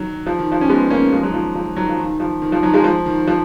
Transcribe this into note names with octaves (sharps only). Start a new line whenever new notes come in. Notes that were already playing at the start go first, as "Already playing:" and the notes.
Already playing: D#3 F#3
F3
D#3
F3
C#4
G#3 B3
A#3 C#4
F3 G#3
D#3 F#3
F3
F3
D#3 F#3
F3
D#3
F3
D#3
F3
D#3 F#3
F3 G#3
F3
D#3
F3